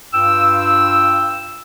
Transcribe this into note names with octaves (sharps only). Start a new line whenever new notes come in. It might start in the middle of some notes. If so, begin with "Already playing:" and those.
G2 F4 G5 E6